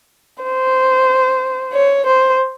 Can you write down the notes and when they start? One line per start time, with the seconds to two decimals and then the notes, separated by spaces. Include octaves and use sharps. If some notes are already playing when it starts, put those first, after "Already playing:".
0.43 C5
1.73 C#5
2.06 C5